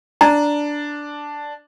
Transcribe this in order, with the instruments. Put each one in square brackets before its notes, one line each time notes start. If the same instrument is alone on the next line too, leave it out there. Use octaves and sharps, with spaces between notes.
[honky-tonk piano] D4 [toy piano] A#5